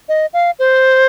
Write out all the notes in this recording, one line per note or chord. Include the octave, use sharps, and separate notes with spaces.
D#5
F5
C5